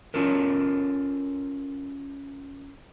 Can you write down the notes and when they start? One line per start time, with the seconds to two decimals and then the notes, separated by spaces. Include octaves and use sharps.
0.14 C#4 F4 A4 A#4